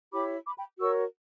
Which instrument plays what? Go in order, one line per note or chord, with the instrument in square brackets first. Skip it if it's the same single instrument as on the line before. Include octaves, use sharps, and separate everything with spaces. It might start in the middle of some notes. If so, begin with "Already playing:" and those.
[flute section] E4 G4 C#5 B5 D6
B5 D6
G5 B5
F#4 A#4 C#5 C#6 E6